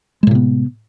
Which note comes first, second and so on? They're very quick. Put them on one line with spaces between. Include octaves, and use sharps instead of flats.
G#3 A2 C3 B3